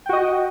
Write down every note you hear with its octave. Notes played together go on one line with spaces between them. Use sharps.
F#4 D#5 G5